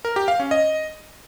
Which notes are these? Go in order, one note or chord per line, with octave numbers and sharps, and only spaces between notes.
A#4
G4
F5
C#4
D#5